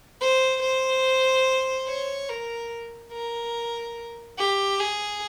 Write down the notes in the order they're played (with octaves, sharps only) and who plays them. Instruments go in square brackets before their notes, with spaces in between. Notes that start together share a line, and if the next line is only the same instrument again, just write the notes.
[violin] C5
C5
C#5
A#4
A#4
G4
G#4